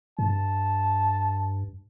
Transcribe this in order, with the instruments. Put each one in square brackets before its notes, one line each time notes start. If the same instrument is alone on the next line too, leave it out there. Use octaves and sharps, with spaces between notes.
[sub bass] G2 [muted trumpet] A5